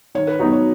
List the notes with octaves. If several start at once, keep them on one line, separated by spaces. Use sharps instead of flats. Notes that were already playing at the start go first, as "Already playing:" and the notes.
D#3 C#5
B4
F#3 B3 D#4 F#4
C#5